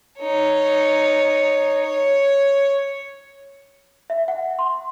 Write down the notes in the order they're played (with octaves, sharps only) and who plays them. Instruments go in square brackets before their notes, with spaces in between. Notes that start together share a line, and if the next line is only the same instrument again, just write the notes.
[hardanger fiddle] D#4 C#5
C#5
[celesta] E5
F#5
C6